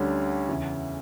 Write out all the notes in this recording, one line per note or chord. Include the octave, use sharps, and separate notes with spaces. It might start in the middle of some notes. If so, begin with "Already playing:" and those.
Already playing: D2 D3 G3 C#4
E2 C#3 E3